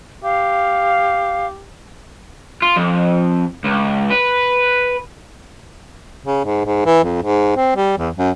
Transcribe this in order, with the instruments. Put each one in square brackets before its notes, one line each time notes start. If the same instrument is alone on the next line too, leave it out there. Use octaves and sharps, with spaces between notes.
[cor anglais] G4 [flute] F5
[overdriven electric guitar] F4
F2
C#2
B4
[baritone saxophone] C#3
G#2
G#2
E3
F2
G#2
C4
G3
E2
F#2